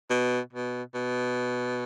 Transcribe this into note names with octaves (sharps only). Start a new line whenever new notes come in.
B2
B2
B2